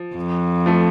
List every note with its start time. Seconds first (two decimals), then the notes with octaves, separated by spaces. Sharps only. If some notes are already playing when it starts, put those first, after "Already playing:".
Already playing: F3
0.16 F2
0.66 F3 A3